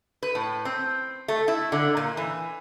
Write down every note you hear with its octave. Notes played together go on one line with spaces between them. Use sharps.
B4
A2
C4
A3
E4
D3
A#2
E3